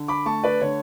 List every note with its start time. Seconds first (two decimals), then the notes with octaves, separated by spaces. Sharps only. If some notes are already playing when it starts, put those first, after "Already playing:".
Already playing: D3
0.08 B5 D6
0.26 A3 A5 C#6
0.44 B4 D5
0.61 D3 C#5